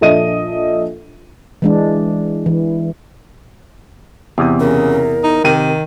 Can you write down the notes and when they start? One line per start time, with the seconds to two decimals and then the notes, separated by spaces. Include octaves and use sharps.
0.01 A#1 D4 A4 D#5 E5 D#7
1.62 E3 G#3 D4
2.46 E3
4.38 E2 C3 D#6
4.60 C#3 A#4
5.23 D#4
5.44 C3 D#3 D#7